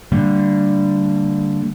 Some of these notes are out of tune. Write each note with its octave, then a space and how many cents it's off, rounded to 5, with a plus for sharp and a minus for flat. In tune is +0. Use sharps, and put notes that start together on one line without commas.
D3 +0 G3 +0 A#3 -35